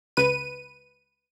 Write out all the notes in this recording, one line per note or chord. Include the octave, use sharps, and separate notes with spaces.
C#2 B4 D#7